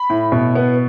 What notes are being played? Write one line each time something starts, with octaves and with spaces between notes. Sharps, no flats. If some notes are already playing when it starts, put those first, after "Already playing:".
Already playing: B5
A2
B2
B3